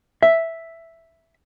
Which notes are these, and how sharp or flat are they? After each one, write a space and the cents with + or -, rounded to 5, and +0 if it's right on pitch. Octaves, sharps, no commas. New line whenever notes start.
E5 +0